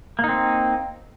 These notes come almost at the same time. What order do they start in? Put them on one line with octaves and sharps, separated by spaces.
A#3 D#4 C4